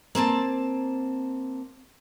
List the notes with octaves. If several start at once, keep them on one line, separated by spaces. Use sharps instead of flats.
A#3 C4 G#5 A5